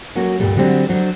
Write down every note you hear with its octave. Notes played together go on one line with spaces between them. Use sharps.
F#3 A#3 C#4 F#4
D2 G2 A#2 G3
D3 F#3 G3 C4
F#3 D4 C5